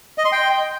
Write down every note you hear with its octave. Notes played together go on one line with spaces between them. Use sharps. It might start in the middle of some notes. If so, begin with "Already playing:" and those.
D#5
C6
G5